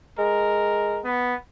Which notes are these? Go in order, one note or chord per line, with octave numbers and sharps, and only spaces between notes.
G#3 A#4
B3